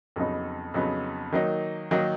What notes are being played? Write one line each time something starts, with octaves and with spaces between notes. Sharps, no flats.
F2 C#3 F#3 B3 D#4
F2 C#3 F#3 B3 D#4
D#3 F#3 A#3 D#4
D#3 F#3 A#3 D#4